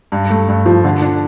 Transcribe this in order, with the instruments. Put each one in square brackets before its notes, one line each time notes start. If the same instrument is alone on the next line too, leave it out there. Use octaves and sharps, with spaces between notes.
[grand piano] G2
A3
G2
F3
D3
D4